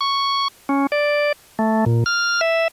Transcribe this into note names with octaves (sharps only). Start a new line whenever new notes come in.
C#6
C#4
D5
A3
A#2
F6
E5